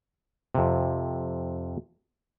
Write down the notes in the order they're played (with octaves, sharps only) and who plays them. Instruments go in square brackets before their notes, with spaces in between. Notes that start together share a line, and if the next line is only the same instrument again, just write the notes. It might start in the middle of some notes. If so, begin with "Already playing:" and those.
[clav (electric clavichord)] F2 C3